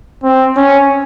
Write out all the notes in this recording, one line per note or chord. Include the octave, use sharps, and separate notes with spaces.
C4
C#4